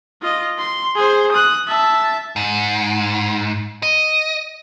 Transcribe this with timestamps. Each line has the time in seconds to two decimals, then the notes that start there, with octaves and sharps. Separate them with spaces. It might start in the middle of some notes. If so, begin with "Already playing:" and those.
0.22 F4 D#5
0.59 C6
0.96 G#4 C5
1.32 D#6 F#6
1.67 E5 A5
2.36 G#2
3.83 D#5